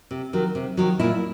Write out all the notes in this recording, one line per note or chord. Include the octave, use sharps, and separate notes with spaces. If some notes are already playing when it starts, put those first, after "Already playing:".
C3
D#3 F#3
C3
D#3 F#3
A#2 E4